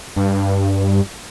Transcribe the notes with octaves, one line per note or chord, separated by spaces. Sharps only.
G2